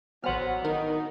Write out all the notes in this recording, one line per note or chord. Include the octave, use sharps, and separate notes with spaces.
A1 F#3 B3 C5 F#5 F6
D#3 D#4 A#4